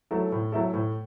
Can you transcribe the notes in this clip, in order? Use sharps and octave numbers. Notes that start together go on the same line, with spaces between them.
F#3 A3 E4 A4
A2
F#3 A3 E4 A4
A2